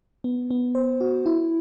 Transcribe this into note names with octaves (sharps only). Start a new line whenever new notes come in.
B3
B3
C5
F#4
E4